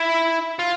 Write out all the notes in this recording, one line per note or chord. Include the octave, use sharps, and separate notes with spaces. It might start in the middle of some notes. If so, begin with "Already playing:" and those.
Already playing: E4
F4